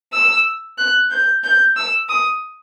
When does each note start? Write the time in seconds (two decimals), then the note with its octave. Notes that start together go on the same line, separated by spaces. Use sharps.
0.13 E6
0.78 F#6
1.11 G6
1.44 G6
1.77 E6
2.09 D#6